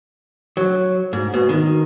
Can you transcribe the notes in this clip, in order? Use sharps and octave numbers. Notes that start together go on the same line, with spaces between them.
F#3
G#2
B2
D#3